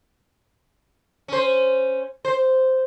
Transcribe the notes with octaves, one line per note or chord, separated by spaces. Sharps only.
C#4 C5
C5